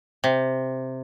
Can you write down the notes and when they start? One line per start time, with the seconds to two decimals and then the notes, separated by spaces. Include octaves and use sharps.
0.24 C3